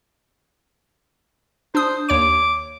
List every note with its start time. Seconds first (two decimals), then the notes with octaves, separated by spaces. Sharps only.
1.75 D4 C5 D#6
2.09 D#2 C#5 D6 D7